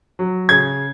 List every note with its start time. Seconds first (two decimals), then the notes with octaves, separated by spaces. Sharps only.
0.19 F#3
0.49 C#3 G#6